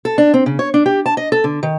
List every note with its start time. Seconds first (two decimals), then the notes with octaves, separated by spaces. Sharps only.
0.05 A4
0.18 D4
0.34 C4
0.46 C#3
0.59 C#5
0.74 D4
0.86 G4
1.06 A5
1.17 D#5
1.32 A4
1.44 D3
1.63 D#3